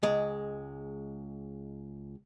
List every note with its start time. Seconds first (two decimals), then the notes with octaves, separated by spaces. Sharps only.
0.03 C#2 G#3